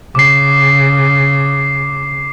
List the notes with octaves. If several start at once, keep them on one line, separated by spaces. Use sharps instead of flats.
C#3 D6 C7